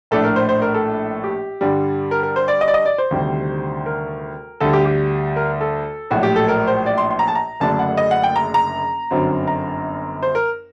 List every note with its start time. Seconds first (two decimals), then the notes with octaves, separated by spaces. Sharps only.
0.11 A#1 A2 A3 D4 A4
0.24 A#4
0.36 C5
0.49 C5
0.62 A#4
0.74 A4
1.24 G4
1.61 G2 D3 G3
2.11 A#4
2.23 A#4
2.36 C5
2.48 D5
2.61 D#5
2.68 D5
2.74 D#5
2.85 D5
2.98 C5
3.11 D2 C3 D#3 G3
3.86 A#4
4.60 D2 D3 G3 A4
4.73 G4
4.86 G4
5.36 A#4
5.61 A4
6.10 A#1 A2 F#3 F#4
6.23 G4
6.36 A4
6.48 A#4
6.67 C5
6.86 D5
6.98 C6
7.11 C6
7.19 A#5
7.28 A5
7.35 A#5
7.60 F#1 F#2 D3 A3 D4 A5
7.79 F#5
7.97 D#5
8.11 F#5
8.24 G5
8.36 A#5
8.54 A#5
9.11 G1 F#2 D3 F#3 C4
9.47 A#5
10.23 C5
10.35 A#4